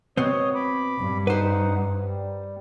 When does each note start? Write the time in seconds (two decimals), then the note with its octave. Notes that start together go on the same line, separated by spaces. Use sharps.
0.17 B2 B3 C4 C#5 D#6
0.55 B5 D6
0.98 G2
1.27 D#4 B4 C5 F#5
2.04 G3